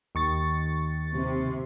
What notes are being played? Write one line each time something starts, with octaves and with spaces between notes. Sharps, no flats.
D#2 C#6 A6
C3